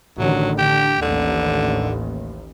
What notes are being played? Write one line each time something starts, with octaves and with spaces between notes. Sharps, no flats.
A1 D3 D#3 F#3
D3 G4
A1 D#2 D3